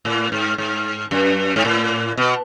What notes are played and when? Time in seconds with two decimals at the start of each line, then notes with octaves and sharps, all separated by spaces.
0.05 A2
0.32 G#2
0.58 G#2
1.11 F#2
1.56 G#2
1.65 A2
2.17 B2